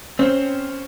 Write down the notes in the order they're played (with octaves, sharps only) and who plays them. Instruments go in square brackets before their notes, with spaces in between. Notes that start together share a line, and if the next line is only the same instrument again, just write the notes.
[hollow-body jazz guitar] C4 [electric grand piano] C#4 C5